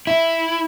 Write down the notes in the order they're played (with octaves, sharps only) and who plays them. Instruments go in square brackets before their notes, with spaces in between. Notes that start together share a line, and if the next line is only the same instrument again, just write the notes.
[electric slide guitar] E4